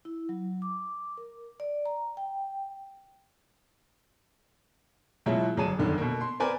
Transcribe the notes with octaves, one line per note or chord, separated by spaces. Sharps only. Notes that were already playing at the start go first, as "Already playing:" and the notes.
E4
F#3
D6
A#4
D5
A#5
G5
B2 E3 F#3 G#3 E4 F4
G1 F#3 G#4 A5 D#7 E7
G1 F#2 D3 D#3
B2 A#3
C6
C4 A#4 B4 D5 G#5